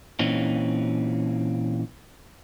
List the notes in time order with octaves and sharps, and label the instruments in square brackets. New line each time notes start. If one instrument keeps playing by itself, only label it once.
[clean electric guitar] A#2 E3 C4 C#4 D#4